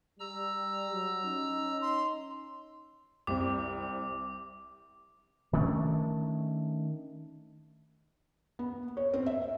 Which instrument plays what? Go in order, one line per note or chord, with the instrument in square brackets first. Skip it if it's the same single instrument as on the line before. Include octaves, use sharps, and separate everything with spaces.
[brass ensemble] G3 [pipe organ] A#5 E6
[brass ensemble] F#3
C#4 D#4
[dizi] C6
[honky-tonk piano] C2 C4 G4 [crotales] D6
[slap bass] D#3 A3 C#4 D4
[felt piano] B3
C#5
C4
E5
E5